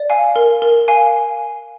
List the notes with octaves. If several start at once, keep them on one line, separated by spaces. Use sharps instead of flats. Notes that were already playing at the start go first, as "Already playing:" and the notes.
Already playing: D5
F5 G#5
A#4
A#4
F5 G#5